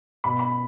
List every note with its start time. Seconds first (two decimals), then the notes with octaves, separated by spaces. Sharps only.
0.24 B2 B5
0.39 B5